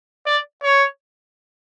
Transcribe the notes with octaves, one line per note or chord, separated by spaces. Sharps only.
D5
C#5